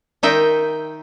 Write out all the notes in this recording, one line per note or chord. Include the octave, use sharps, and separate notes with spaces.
D#3 D#4 E5 G5